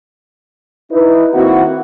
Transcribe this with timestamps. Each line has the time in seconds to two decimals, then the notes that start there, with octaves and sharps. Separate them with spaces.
0.92 D#4 E4 B4
1.34 D#3 A#3 C4 E4 F#4